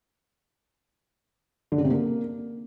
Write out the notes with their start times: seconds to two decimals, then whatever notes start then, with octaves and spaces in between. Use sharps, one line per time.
1.72 D3
1.78 C#3
1.84 C3
1.91 A#3